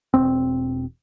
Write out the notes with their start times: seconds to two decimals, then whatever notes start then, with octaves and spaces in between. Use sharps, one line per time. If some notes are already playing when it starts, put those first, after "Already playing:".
0.14 E1 C4